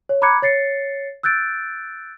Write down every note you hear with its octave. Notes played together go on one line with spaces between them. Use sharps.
C#5
A#5 B5 D6 F#6 G#6 C#7
C#5 A6 C7 C#7
E6 F#6 G6 A6 D7